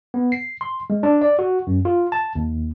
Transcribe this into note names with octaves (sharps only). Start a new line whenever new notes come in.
B3
C7
C6
G#3
D4
D5
F#4
F#2
F4
A5
D#2